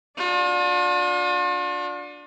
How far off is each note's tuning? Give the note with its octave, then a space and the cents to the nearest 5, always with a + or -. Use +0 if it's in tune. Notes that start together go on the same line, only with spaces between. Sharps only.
D4 +0 F4 +45